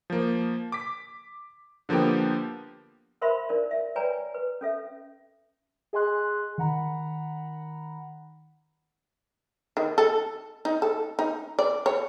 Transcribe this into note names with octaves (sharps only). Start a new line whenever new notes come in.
F3 A#3
D6 B6
D3 F3 A#3 B3 G4
A#4 C5 E5 F5 B5 C6
D#4 A#4 D5
E5
B4 C#5 D5 G5 G#5 A#5
B4
C#4 A4 E5
G#4 D#5 G#5 C6 F#6
D#3 F#5 A#5 B5
D#3
A4
D#4
A4
D#4
D5
C#5